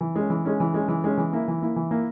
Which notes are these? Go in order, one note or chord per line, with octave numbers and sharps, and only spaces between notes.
E3
G#3 C#4
E3
G#3 C#4
E3
G#3 C#4
E3
G#3 C#4
E3
A#3 E4
E3
A#3 E4
E3
A#3 E4